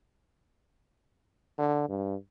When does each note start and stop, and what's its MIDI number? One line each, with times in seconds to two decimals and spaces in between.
1.58 1.86 50
1.89 2.15 43